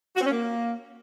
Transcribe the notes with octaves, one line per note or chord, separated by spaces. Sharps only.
F#4
C4
C#4
A#3